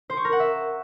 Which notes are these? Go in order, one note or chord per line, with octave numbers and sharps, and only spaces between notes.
C5
C#6
A#4
F#5
E5